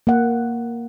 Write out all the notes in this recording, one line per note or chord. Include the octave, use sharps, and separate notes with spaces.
A#3 F#5